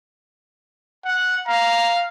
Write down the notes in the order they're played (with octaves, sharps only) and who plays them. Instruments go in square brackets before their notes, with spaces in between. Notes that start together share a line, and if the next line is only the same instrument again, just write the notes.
[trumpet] F#5
[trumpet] F5 [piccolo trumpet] A#5